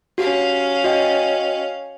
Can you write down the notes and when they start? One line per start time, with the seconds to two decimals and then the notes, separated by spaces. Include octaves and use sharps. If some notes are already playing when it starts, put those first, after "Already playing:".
0.18 C#4 F#4 G4 F5
0.84 F#4 D#5 G5